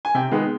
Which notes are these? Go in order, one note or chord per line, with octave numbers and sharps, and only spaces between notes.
G#5
C3 G5
D#3 G#3 B3